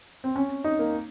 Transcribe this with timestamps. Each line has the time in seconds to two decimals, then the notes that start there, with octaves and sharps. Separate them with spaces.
0.24 C4
0.36 C#4
0.64 D#4
0.79 A#3